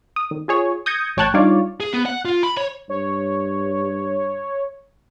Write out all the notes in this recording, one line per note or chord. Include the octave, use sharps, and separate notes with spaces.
D#6
D#3
F4 G#4 C#5
D#6 G6 G#6 A#6 C#7
A1 C#5 G5 A5 F#6 G#6
G3 D4 D#4 F4 C#5 D5
G#4
B3
F#5
F4
B5
C#5
G2 C#5